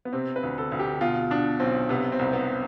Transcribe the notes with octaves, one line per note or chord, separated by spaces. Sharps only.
B3
C3 C4
B4
D2
A4
D2
G4
B2 F4
B2 D4
B1 C4
C3 B3
C4
C2
B3